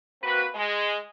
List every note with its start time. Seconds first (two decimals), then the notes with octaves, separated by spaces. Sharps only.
0.23 A#3 C4 F#4 B4
0.55 G#3